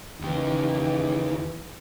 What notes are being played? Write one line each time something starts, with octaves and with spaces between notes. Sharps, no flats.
D#2 C#3 E3 D#4 G4